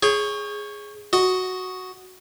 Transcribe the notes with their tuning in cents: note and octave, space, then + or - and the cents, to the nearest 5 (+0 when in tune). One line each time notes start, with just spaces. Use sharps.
G#4 +0 C#5 +0 G5 +40
F#4 +0 D#5 +0